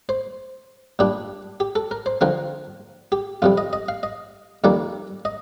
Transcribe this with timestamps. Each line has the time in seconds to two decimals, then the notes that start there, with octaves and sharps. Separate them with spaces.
0.09 C5
0.99 A#2 G3 D4 G4
1.60 G4
1.76 A4
1.91 A#4
2.06 C5
2.21 D3 F3 C4 A#4
3.12 G4
3.42 F2 C3 G3 F4
3.58 D#5
3.73 D#5
3.88 F5
4.03 D#5
4.64 F2 D#3 G3 A#3 D5
5.25 D#5